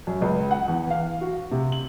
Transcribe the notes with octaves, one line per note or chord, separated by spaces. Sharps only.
F#2
C#2
F#5
E2
F5
F#4
C3
F#7